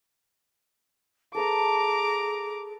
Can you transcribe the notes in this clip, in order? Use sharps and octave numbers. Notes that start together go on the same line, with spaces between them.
G#4 A4 B4 A#5 D6 D#6